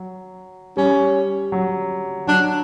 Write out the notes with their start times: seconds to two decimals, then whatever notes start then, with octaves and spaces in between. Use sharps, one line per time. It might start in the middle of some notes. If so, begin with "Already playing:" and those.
Already playing: F#3
0.77 G3 C#4
1.52 F#3
2.27 F#3 D4